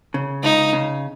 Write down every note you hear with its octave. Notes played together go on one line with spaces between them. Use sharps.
C#3
C#2 D#4
C#3